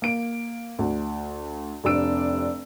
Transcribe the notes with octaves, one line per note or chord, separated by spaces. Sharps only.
A#3 D7
D2
F1 C3 D4 D5 E6 D7